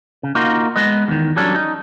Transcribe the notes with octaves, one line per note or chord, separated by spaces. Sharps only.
C#3
A#3 D#4 F4 F#4
G#3 B3 D#5
E2 D#3
F#3 G3 C#4 D4 A4
D#4